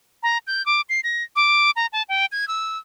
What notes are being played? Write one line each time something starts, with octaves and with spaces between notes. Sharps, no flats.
A#5
G6
D6
C7
A#6
D6
A#5
A5
G5
G#6
E6